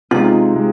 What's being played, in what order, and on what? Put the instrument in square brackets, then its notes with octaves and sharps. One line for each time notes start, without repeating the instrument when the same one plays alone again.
[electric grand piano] C3 G#3 D#4 [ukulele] F4
[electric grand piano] C3 G#3